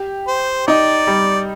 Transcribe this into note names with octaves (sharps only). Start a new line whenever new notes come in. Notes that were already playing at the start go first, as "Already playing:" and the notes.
Already playing: G4
C5
D#4 D5
G3